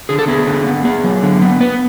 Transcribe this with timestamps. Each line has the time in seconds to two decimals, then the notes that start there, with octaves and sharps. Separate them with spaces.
0.09 D3 G#4
0.19 A4
0.28 B3 G#4
0.47 D3
0.66 B3
0.85 B3 G#4
1.04 F#3
1.23 D3
1.42 B3
1.60 B3 B4